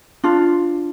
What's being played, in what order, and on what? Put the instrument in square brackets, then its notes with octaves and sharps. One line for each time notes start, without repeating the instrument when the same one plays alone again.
[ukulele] D4 F4